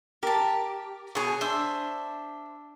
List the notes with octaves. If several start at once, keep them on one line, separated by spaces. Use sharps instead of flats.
G4 A#4 A5
B2 G#4 C#5 G#5
D4 C5 E5